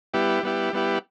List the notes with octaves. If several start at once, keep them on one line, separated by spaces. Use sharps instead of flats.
G3 B3 E4 G4
G3 B3 E4 G4
G3 B3 E4 G4